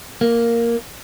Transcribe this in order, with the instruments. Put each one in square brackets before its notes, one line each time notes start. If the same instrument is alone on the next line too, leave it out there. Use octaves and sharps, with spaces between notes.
[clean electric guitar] A#3